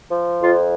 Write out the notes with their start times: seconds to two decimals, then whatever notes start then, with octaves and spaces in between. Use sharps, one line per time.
0.10 F3
0.39 F2 F4